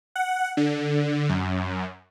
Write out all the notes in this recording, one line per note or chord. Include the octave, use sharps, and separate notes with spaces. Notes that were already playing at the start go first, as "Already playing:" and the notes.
F#5
D3
F#2